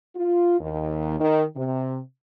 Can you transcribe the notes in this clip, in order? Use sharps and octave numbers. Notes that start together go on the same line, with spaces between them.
F4
D#2
D#3
C3